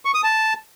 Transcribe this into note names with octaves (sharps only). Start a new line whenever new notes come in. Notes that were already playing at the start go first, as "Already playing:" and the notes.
C#6
D#6
A5